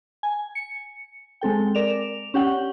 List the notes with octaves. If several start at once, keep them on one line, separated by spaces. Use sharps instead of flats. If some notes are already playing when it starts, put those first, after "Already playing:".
G#5
C#7
G#3 C4 A4 G5
A#4 D5 E7 F7
C#4 G4 F#5 G5